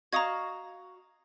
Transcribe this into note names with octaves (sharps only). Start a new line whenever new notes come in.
F#4 D#5 F5 A#5 D#6 G#6